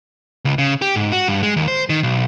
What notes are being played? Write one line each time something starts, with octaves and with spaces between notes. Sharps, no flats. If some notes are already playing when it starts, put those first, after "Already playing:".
C#2
C#3
G4
G#2
F#4
G2
G#3
D#2
C5
D#3
B1